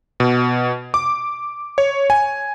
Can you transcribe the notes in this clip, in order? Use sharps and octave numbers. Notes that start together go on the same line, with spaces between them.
B2
D6
C#5
G#5